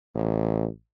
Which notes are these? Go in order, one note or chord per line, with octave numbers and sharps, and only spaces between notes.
A1